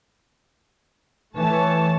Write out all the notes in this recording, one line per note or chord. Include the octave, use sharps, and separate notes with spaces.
E3 A3 C#5 A5